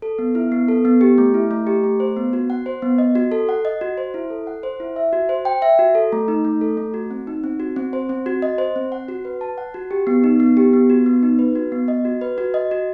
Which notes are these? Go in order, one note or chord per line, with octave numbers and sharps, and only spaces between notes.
A4
B3
E4
B3
A4
B3
G4
A3
E4
A3
G4
A3
C5
B3
F#4
F#5
C5
B3
D#5
F#4
A4
F#5
D#5
F#4
C5
E4
A4
F#5
C5
E4
E5
F#4
C5
G5
E5
F#4
A4
A3
D#4
A3
A4
A3
F#4
C4
D#4
C4
F#4
C4
C5
C4
F#4
D#5
C5
C4
F#5
F#4
B4
A5
F#5
F#4
G4
B3
D#4
B3
G4
B3
F#4
B3
D#4
B4
F#4
B3
D#5
F#4
B4
F#4
D#5
F#4